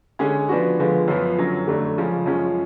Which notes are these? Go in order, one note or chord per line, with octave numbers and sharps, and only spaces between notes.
D3 G#3 C#4 G#4
F3 B3 D4 F#4
D3 F3 G#3 B3 F4
F#2 F3 B3
F#2 D3 F#3 C#4
F2 D3 F#3 A3 D4
C#3 F3 G#3 C#4
F#2 F3 G#3 C#4